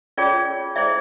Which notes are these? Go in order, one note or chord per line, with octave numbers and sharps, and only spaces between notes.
C#4 F4 G#4 C#5 D5
E4 G#4 C5 D5 E5